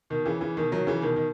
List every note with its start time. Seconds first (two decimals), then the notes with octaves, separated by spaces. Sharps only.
0.10 B2 D#3
0.26 C#3 E3
0.41 C#3 E3
0.57 B2 D#3
0.72 D#3 F#3
0.87 C#3 E3
1.02 B2 D#3
1.16 D#3